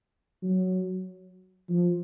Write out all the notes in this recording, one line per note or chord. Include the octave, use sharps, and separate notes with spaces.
F#3
F3